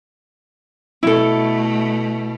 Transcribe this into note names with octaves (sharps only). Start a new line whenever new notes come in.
B2 A3 E4 A4